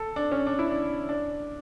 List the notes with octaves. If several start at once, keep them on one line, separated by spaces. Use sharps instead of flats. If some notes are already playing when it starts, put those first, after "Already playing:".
Already playing: A4
D4
C#4
D4
E4
D4
D4